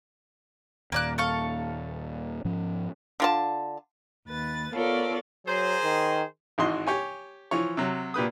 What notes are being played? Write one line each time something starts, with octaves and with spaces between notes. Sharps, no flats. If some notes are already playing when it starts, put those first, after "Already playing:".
D#2 A#2 A#3 D5 F#6
A4 F5 C#6
G#2 F3 C#4
D3 F4 A5
D#2 B4 A6
B3 F4 A4 A#4 C#5 D5
F#3 G#4 A#4 C5
D#3
G#1 G#2 E3 F#4 D#5 C6
G4 C#5 G#5
E3 F3 C#5
C3 F#3
A#2 G4 B4 D#6